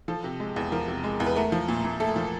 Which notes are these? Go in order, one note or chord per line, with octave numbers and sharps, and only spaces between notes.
F3 A4
C3
G#3
E2
F3 A#4
C3
G#3
E2
B4
A3 A#4
F3
A#2
A#2
A3 A4
F3